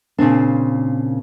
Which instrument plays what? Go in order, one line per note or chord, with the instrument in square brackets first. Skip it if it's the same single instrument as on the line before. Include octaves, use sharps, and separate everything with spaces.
[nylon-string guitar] A#2 C#3 C4 D4